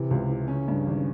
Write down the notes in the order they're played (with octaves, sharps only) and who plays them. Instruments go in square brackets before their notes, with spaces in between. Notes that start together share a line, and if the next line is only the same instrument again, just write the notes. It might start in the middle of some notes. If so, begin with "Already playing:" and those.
Already playing: [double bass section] C3 [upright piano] E3
[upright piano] C#2
E3
[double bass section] C#3 [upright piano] C#4
[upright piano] G2
G#1